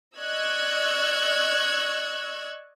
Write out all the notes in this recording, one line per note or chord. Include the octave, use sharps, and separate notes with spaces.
D5 D#5 C#6 E6 F#6 G#6